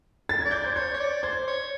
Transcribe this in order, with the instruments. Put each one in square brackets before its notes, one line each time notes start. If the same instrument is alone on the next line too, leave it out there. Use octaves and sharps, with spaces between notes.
[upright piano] A6
[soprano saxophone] D5 [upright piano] G#6
[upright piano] G6
[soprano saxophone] C5 [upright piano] G#6
[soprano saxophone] C#5 [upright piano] G6
[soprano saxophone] C#5
D5
[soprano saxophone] C5 [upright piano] G#6
[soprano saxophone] C#5